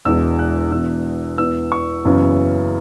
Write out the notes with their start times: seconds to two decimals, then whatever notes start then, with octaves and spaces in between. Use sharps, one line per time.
0.05 E1 E2 E3 G#3 E6
0.39 F#6
0.72 E1 E2 E3 E6
1.38 E2 E3 B3 E6
1.72 C#6
2.05 F#1 F#2 C#3 E3 B3